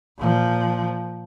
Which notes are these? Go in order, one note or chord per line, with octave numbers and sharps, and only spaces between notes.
A#2 F3